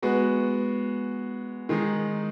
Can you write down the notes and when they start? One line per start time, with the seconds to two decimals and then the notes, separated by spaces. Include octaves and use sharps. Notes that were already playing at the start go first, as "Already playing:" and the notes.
0.02 G#3 B3 F#4
1.69 D#3 G#3 D#4